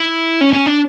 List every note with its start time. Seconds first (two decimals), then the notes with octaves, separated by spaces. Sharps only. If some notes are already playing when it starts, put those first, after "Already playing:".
Already playing: E4
0.41 C#4
0.53 C#4
0.66 D4